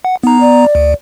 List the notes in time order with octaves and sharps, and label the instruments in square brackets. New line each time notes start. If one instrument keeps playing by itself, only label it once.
[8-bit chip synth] F#5
[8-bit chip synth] B3 A#5 [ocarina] D#4
[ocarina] D5
[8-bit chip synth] D2